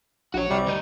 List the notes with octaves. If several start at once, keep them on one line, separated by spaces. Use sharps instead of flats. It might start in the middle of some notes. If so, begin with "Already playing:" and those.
A#1 F#4 C#5
C2 C3 G3
D2 D#4